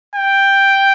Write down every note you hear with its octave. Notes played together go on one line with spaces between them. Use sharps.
G5